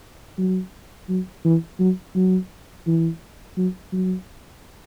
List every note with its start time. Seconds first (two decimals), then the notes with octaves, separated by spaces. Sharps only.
0.38 F#3
1.09 F#3
1.45 E3
1.80 F#3
2.16 F#3
2.87 E3
3.57 F#3
3.93 F#3